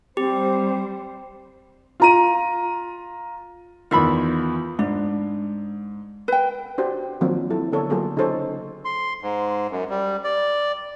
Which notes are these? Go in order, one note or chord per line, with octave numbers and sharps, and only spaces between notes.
G3 C4 G4 C5
F4 A#5 D#7
E2 D#3 F4 E5 B5
G#2 D4
B4 G5
D4 F#4 G4 C5
D#3 F3 F#3 A#3 C4 D4
F#3 E4 A4
D3 B3 D4 A4 A#4 C#5
F#3 A#3 F4 G#4 A4
C#3 D#4 G#4 A4 C5 C#5
C6
G#2
F#2
G3
D5